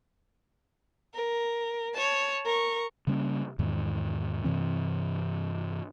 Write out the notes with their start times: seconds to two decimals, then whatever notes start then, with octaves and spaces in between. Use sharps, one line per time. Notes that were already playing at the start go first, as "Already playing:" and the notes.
1.14 A#4
1.94 C#5 A5
2.45 A#4 C#6
3.07 C#3 G3 A#3 C#4
3.59 E2 G#2 D#3
4.44 G2 C3 E3 C4